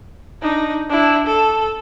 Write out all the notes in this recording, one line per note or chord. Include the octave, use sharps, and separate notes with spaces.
D4 D#4
D4 E4
A4